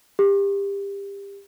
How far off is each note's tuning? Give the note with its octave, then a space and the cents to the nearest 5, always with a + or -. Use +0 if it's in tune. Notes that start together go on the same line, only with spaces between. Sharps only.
G4 +25